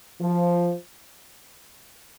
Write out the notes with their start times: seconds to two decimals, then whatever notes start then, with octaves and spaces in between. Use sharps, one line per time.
0.20 F3